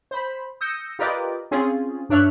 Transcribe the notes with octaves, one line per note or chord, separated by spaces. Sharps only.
C5 B5
D#6 E6 G6 A#6 C#7
F4 G4 A#4 B4 D5 D#5
C4 C#4 F4 G#4
G2 D4 C#5 E5 F6 F#6